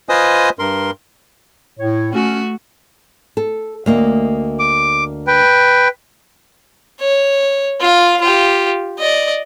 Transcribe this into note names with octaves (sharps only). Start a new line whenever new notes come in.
F4 B4 C5 D#5 G#5 D#6
G2 A#4 C6
A2 C#5
A3 C#4 F#4
A4
D2 A#3 D#5
D6
B4 G5
C#5
F4 F5
F4 G4
D5 D#5